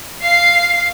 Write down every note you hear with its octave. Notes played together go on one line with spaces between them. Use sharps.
F5 C7